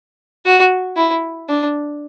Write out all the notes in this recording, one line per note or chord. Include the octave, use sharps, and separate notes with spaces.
F#4
E4
D4